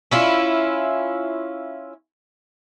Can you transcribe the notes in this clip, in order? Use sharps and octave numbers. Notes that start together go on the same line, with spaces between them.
C#4 E4 F4